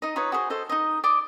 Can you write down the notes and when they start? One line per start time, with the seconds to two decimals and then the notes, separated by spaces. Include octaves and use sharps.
0.02 D#4 D#5
0.16 D#4 F4 B4 C#5
0.32 F#4 G#4 B4 C5
0.50 A4 C5 D#5
0.69 D#4 D#5
1.04 D5 D#5 D6